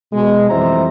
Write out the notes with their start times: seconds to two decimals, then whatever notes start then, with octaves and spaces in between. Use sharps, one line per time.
0.12 B2 G#3
0.50 F2 E3 G3 C5 E5 A#5